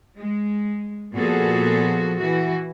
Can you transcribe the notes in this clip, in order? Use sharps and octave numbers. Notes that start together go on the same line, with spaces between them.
G#3
A#2 F3 B3 F#4 G#4 A4
E3 F#4